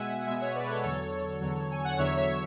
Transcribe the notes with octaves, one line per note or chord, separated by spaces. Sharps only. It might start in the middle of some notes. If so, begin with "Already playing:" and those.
Already playing: B2 G#3 E5 F#5 G#5
B2 G#3 E5 G#5
C#5 E5
B4 D5
A4 C#5
E2 D3 F#3 A4 C#5
E2 D3 F#3
G#5
F#5
E2 D3 F#3 C#5 E5
C#5 E5